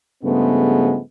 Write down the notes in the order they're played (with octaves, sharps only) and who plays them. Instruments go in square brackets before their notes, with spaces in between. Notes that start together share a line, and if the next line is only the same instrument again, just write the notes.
[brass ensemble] G2 C#3 F3 G#3 A3 B3